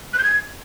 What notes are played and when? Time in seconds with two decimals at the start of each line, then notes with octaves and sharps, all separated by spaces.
0.13 F#6
0.18 G6
0.23 G#6